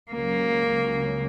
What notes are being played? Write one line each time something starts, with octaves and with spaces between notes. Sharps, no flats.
C#2 C#3 F#3 A#3 C#4